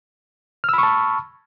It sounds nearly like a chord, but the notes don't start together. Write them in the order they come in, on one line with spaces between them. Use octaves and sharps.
F6 E6 B5 C#6 A5